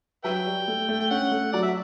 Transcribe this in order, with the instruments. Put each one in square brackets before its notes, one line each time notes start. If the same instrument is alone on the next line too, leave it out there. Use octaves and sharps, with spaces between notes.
[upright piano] F#3 [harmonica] B4 E5 G5
[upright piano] G3
A3
A3
[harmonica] G5
[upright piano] C#4 [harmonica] F#5
[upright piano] A3
[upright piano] F#3 [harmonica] D5
[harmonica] E5